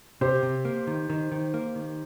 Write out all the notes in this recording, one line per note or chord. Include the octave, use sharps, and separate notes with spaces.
C3 G4 C5
C3
A#3
D#3
D#3
D#3
A#3
D#3